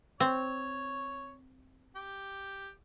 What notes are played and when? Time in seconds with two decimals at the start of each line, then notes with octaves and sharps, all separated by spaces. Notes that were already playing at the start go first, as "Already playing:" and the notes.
0.20 C4 C#5
1.96 G4